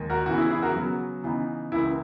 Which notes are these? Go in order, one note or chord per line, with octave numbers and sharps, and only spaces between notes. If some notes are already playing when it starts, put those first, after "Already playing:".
Already playing: D#2 D#3 G#3
F#4 A#4
C#3 E3 B3 F#4
E4 G#4
E4 G#4
F#4 A#4
C#3 F#3 B3
C#3 E3 B3 D#4
C#2 C#3 E3 A#3 E4